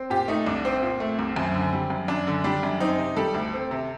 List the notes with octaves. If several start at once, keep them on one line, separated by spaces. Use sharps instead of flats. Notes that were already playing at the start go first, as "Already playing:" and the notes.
Already playing: C4
A#2 G4
A3 D#4
C2 D4
C4
A#2
A3
C2
F#2
D3
G3
F#2
F#2 D4
D3
G3 D4
F#2
C4 D#4
C3
G3 A4
D2
C4
C3